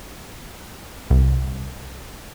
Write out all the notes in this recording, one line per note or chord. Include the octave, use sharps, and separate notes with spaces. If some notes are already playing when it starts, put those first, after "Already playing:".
C2